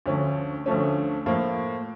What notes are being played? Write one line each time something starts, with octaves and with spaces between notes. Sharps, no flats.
D2 D3 F3 A3 C#4
D2 D3 F3 A3 C#4
A2 F3 A#3